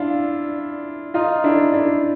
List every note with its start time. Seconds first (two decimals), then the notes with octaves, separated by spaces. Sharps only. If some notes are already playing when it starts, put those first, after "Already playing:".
Already playing: D4 E4 F4
1.14 D#4 F4
1.44 D4 E4
1.74 D4 E4